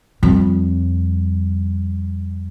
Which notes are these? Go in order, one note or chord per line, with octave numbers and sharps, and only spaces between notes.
F2 G3